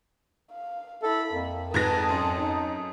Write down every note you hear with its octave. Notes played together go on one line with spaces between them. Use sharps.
F5
E4 A4 B5
F2 A#3
G#2 B4 A5 D#6 G#6 A#6
F#2 C6
D#4